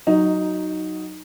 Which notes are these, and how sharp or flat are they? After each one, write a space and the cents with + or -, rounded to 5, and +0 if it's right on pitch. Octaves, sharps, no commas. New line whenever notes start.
F#3 +5 D#4 +0